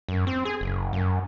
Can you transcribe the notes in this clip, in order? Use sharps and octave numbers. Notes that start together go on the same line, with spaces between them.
F#2
C4
G#4
F#1
F#2